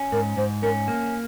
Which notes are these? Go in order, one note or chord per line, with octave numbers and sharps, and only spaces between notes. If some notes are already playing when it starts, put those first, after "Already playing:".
Already playing: C#4
G#2 A#4
G#2 C5
C#4 A#4
A#3